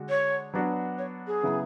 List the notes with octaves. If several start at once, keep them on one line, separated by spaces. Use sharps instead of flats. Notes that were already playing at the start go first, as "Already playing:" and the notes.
Already playing: D3 G#3 D4 F#4
C#5
F#3 B3 D4 F#4
C#5
G#4
C#3 F#3 B3 E4